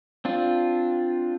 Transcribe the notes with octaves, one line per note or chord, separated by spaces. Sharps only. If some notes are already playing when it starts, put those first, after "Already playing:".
C4 D4 F4